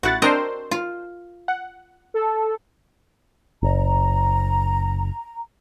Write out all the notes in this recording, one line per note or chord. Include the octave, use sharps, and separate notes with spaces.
A1 E4 F#4 F#5 A6
C4 D4 A#4 C5 D#5 A#5
F4
F#5
A4
F#1 A#5